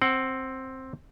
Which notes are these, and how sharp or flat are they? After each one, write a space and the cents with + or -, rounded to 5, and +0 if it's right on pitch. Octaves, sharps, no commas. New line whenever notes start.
C4 +10 F#5 +30